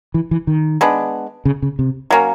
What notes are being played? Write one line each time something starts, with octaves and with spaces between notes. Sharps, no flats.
E3
E3
D#3
G#3 B3 D4
C#3
C#3
C3
F#3 A#3 C#4